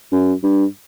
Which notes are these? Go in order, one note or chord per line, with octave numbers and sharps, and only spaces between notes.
F#2
G2